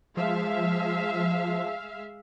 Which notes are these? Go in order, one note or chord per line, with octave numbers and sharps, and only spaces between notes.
F3 G#3 E5 F5